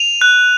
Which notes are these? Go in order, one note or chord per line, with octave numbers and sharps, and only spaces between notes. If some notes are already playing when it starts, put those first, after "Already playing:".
Already playing: D#7 F7
F#6